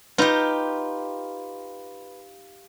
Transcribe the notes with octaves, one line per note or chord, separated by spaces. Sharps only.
D#4 F4 G4 B4 A#5 B5